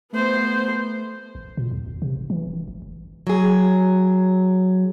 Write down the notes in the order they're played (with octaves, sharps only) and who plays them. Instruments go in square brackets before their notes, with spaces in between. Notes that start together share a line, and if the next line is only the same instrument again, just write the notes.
[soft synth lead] A3 [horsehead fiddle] B3 C5
[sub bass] A1
A#2
D#2
G1
C3
G1
E3
D#1
G#1
F#1
[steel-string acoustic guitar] F#3 G#4